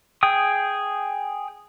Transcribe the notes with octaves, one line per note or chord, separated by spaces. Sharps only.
G#4 G5 D#6